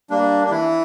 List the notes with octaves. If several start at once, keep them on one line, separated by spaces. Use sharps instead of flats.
G3 A#3 D4
D4
E3 E4